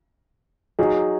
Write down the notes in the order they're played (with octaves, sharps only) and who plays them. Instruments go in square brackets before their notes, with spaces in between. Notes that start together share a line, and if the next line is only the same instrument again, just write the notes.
[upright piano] F#3 D#4 G#4